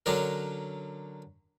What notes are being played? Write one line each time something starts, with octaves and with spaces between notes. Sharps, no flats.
D3 F#3 C#4 D4 A#4